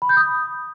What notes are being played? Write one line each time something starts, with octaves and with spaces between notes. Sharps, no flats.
B5
G6
D#6